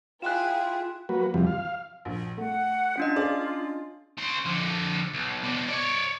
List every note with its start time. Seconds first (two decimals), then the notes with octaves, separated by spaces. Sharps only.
0.22 E4 F4 G#4 G5 F#6 E7
1.09 F#3 A#3 F#4 B4
1.34 F2 C3 E3 F3 G3
1.47 F5
2.05 A#1
2.37 A3 F#5
2.97 C#4 D4 F4 D#5
3.16 G#4 D5 F5
4.18 C#4 C6
4.45 F2 D3
5.13 B1
5.43 B2 D4
5.68 C#5 D5